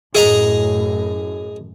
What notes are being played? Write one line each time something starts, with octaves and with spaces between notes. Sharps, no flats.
F#2 A2 G#4 D#5 A#5